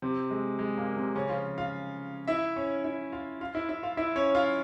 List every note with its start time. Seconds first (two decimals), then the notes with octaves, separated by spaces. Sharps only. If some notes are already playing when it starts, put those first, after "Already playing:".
0.02 C3 C4
0.30 G#3
0.59 G#3
0.78 A#2 A#3
0.96 C3 C4
1.15 C#3 C#4
1.29 F3 F4
1.58 F4 F5
2.28 E4 E5
2.56 C#4 C#5
2.84 E4 E5
3.12 F4 F5
3.41 F4 F5
3.55 E4 E5
3.69 E4 E5
3.83 F4 F5
3.97 E4 E5
4.16 C#4 C#5
4.35 F4 F5